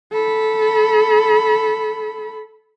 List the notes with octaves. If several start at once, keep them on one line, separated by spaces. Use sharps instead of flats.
A4 B5